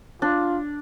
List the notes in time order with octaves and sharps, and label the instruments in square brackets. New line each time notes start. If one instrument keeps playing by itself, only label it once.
[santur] D4 [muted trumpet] F4